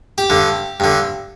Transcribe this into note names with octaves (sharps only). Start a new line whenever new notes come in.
G4
G2 D3
G2 D3